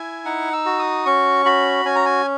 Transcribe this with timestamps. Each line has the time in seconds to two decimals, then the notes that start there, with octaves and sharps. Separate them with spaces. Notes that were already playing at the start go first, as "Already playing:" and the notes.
Already playing: E4 G#5
0.25 D#4 F#5
0.53 E6
0.66 F#4
0.79 D#6
1.06 C#4 C#6
1.45 F#4 B5
1.85 C#4 G#5
1.95 A#5
2.05 G#5